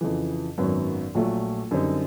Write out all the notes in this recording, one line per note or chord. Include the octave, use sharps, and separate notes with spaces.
F2 C#3 E3
G#1 F#2 D#3 F#3 B3
A#1 A#2 F#3 A3
F#2 D3 G3 C4 D#4